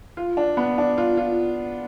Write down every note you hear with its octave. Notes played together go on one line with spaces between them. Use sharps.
F4
D4
B3
D4
F4
F4